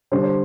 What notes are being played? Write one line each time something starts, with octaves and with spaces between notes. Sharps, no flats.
D3 G3 D4 C5
C5